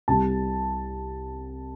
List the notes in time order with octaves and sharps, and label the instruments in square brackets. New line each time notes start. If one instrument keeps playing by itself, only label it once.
[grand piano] C2 C3 G3 A5